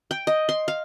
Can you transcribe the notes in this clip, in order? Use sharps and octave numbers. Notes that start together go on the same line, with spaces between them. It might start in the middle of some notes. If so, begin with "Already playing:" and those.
G5
D#5
C6
F5